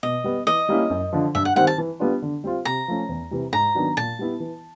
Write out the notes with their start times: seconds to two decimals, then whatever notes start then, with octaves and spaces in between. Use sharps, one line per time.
0.03 B2 D#5
0.24 G3 B3
0.47 E3 D#5
0.69 G3 A#3 C#4 E4
0.90 F#2
1.13 D3 F3
1.35 G2 E5
1.45 F#5
1.56 D#3 G3 C4 F#5
1.67 A5
1.78 E3
1.99 G3 B3 D4 F4
2.22 D3
2.44 G3 C4 F4
2.65 C3 A#5
2.88 F3 A3 C#4
3.09 E2
3.31 C3 E3 G3
3.53 G#2 A#5
3.75 D#3 F#3 B3 D4
3.97 A#2 A5
4.19 G3 B3 E4
4.40 E3